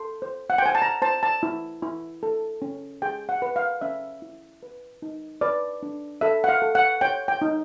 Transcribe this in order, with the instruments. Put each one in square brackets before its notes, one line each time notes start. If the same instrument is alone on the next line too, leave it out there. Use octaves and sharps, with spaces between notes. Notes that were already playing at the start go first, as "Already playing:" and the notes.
Already playing: [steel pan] A4 C6
C5
F#5
G5
C5 G#5
A5
A#5
C5 A5
A5
E4
E4
A4
C#4
G#4 G5
F#5
B4
F5
C#4 E5
E4
B4
D#4
B4 D5
D4
A4 E5
F#5
F5
A4
F#5
C#5 G5
G5
D#4